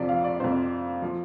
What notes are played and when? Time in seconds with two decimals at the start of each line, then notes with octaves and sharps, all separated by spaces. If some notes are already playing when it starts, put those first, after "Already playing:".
Already playing: F2 C3 F3 D5
0.09 F5
0.24 D5
0.40 F2 C3 F3 C5
1.02 F3